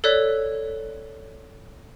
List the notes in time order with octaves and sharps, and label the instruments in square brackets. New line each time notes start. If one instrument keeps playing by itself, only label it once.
[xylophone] A4 C#5 D5 F#6 B6